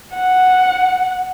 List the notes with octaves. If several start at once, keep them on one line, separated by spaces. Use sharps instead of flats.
F#5